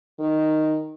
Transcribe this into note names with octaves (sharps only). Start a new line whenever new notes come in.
D#3